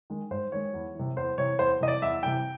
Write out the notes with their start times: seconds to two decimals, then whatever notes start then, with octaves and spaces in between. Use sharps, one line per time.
0.10 D#3 G#3
0.31 G#2 C5
0.52 D#3 G#3 C#5
0.74 E2
0.95 C3 E3
1.16 E2 C5
1.38 C3 E3 C#5
1.59 E2 C5
1.81 C3 E3 D#5
1.88 D5
2.02 E2 E5
2.23 C3 E3 G5